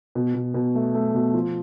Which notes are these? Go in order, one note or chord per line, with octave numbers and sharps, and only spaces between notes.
B2
B2
B2
A3
A3
B2
F3